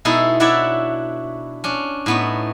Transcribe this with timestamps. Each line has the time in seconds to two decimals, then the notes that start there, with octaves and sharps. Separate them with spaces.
0.05 B2 G#3 D#4 E4 A4
0.40 D4 E4 F#4 C#5 D5 E5
1.64 C#4 D4
2.06 A2 B3 D#4